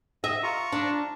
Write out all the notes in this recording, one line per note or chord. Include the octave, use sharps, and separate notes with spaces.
D#5 E5
F4 A#5 C#6
D4